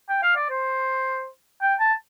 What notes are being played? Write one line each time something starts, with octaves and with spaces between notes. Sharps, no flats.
G5
F5
D5
C5
G5
A5